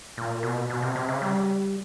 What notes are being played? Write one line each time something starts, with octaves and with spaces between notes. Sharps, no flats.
A#2
B2
B2
C3
C3
C#3
G3